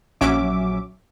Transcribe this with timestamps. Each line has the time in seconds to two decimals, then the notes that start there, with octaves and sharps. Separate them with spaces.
0.21 A#1 F#3 C#4 E5 D6